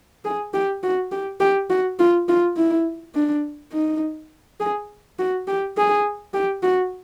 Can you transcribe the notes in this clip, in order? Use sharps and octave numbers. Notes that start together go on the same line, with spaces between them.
G#4
G4
F#4
G4
G4
F#4
F4
F4
E4
D4
D#4
G#4
F#4
G4
G#4
G4
F#4